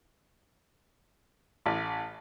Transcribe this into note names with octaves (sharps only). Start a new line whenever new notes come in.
A1